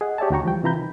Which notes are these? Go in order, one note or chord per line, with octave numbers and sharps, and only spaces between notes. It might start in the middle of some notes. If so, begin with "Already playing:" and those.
G#4 D#5 F#5
G4 C#5 D5 E5 G#5 A5
D2 D#3 F#4 G5 A#5 C#6
E3 F3 G3 G5
C3 E3 F4 A#5 B5 G6
D#3